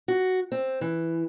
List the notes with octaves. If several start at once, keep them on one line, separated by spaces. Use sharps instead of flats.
F#4
C4
E3